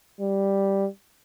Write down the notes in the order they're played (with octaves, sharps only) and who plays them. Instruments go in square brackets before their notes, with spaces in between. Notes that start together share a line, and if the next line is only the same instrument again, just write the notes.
[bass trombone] G3